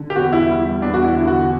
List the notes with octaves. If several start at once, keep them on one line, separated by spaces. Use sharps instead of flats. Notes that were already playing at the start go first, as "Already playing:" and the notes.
Already playing: D3
G4
E2 F#4
E4
G3 E4
E2 D4
F#4
E4
D3
F#4